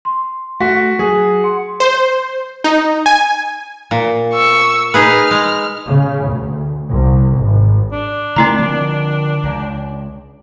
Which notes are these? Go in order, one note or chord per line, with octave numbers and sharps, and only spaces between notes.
C6
A3 F#4 B6
F#3 F#4 G#4
F#5 C6
C5
D#4
G#5
A#2
C#6 E6
D#4 G#4 B4 F6
G#3
C#3
D2
C2
G#1
D4
C#3 A3 A#3 C4 E4 A#5
D3 F3
C#2